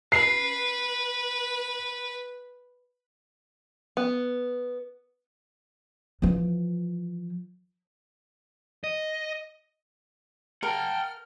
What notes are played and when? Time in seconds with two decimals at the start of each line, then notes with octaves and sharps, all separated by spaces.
0.12 B4 C7
3.97 B3
6.22 E3 F3
8.84 D#5
10.63 A#4 F#5 G5 A5 F6